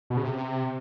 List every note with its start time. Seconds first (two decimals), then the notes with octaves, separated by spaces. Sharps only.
0.10 B2
0.17 C#3
0.23 C3